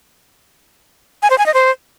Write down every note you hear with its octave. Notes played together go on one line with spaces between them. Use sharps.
G#5
C5
G#5
D#5
C5